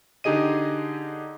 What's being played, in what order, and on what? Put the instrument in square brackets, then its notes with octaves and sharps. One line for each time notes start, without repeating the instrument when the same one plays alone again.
[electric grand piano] D3 D#4 G4 G#4 D#5 D#7